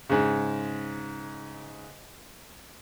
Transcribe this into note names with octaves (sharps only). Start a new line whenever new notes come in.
G#2 C#3